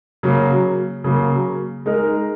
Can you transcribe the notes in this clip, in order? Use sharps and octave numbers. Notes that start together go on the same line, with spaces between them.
C#3 F#3 A#3
C#3 F#3 A#3
G#3 D#4 A#4